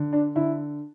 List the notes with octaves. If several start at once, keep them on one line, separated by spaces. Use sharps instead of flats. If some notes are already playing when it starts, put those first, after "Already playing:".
Already playing: D3
D4
D3 E4